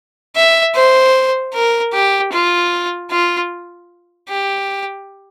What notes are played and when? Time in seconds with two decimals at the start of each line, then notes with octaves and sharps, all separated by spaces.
0.36 E5
0.75 C5
1.54 A#4
1.93 G4
2.32 F4
3.10 F4
4.29 G4